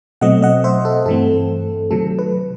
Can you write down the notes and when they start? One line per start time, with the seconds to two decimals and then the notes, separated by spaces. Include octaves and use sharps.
0.21 B2 F#3 A3 C4 D#5 F#5
0.42 D#5 F#5
0.64 C5 E5
0.85 A4
1.06 G2 E3 A3 C4 A4
1.91 C3 D#3 F#3 A3 A4
2.19 B4